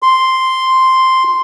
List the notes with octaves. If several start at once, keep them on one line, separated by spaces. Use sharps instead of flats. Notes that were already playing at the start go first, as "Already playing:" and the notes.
C6